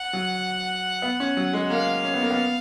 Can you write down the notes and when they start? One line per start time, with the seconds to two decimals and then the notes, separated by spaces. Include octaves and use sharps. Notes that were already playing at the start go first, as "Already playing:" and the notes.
Already playing: F#5
0.13 F#3
1.02 B3
1.20 C#4
1.37 F#3
1.53 G#3
1.70 A#3 F5
2.04 C#4
2.14 B3
2.22 A#3
2.31 B3